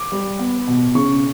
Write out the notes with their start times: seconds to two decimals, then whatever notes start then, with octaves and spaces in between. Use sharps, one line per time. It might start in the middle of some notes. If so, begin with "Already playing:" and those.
Already playing: D6
0.12 G3
0.39 B3
0.67 B2
0.95 C#3 C#6